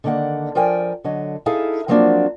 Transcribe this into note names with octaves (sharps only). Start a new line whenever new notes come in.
D3 D#3 A#3 D5 F#5
F3 A#4 D5 G5 G#5
D3 F#3 D#5
D#4 E4 G#4 A4 F5
F3 F#3 A#3 C4 D4 F#4